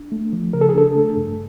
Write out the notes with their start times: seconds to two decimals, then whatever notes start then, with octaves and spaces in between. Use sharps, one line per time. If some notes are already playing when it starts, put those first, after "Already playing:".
Already playing: D4
0.12 A3
0.33 F3
0.53 C#3 A#4
0.61 A4
0.69 G#4
0.74 D4 A4
0.96 A3
1.16 G2